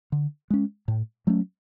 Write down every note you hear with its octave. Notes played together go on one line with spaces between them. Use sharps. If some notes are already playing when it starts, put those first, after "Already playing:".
D3
G#3 C#4
A2
F#3 A3 C#4